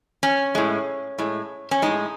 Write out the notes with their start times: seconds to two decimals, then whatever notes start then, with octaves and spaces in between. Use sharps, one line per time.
0.23 C#4
0.55 A2 G#3
1.18 A2 G#3
1.71 C#4
1.82 A2 G#3 D#4